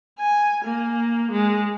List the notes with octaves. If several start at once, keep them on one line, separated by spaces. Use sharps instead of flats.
G#5
A#3
G#3